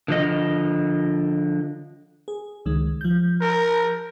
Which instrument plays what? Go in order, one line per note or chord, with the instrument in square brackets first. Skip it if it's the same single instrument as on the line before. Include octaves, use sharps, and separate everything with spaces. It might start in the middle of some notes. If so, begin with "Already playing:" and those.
[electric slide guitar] D3 F3 D#5
[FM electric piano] G#4
C#2 D#3 G#3
F3 G6
[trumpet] A#4